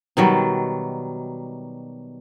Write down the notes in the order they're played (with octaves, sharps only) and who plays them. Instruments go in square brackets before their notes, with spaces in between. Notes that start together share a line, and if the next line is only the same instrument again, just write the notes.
[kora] B2 D#3 F#3 G3